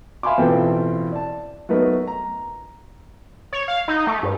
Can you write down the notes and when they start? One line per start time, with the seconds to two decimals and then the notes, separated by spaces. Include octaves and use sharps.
0.23 E5 F5 G#5 B5 C6 D6
0.38 A1 B2 C4 F4 A4 G5
1.12 D5 A5
1.69 F#3 A3 B3 D#4 A#4 B4
2.07 A#5
3.53 C#5
3.68 F5
3.88 D#4
4.07 A3
4.23 G2